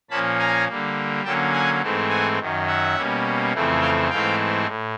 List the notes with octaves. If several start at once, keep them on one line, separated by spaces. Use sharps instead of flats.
A#2 F3 A#3 C#4 A5 B5
G#5 A#5
D3 G3 A#3
D3 F#3 A#3 C#4 G5 A5
F#5 G#5
G#2 E3 A3 C4
F#5 G#5
F#2 D#3 F#3
E5 F#5
B2 G3 A#3 C#4
F2 C#3 E3 A3 C4
F5 G5
G#2 E3 A3 C4 F5 G5
A2